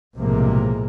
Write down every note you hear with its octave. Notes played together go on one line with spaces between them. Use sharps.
B1 A2 C3 F3 G#3 A#3